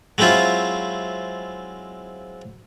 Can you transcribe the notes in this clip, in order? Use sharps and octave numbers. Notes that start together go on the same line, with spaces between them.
F#3 G#3 C4 E4 F4